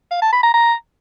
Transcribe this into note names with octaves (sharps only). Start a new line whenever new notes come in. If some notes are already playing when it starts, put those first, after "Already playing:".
F5
A5
B5
A#5
A#5